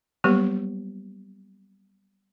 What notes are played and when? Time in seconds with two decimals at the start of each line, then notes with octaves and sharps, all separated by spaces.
0.24 F#3 G3 A#3 B3 G4 B4